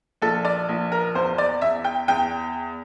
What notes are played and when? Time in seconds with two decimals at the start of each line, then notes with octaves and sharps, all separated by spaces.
0.22 A#1 A4
0.45 D5
0.69 A#1
0.92 A#4
1.15 E2 C5
1.38 D5
1.61 E2 E5
1.84 G5
2.08 E2 G5